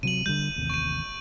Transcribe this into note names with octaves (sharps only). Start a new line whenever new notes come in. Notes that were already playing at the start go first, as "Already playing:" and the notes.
C3 F#3 D#7 F#7
D3 E3 G3 G6
A1 D#2 C3
C#6 D#7